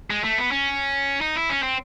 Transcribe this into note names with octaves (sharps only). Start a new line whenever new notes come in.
G#3
A3
B3
C#4
D#4
E4
C#4
C4